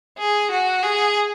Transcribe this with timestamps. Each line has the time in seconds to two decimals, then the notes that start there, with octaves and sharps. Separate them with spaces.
0.19 G#4
0.52 F#4
0.83 G#4